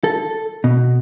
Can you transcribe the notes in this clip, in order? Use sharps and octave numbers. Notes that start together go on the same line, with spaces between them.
A4
B2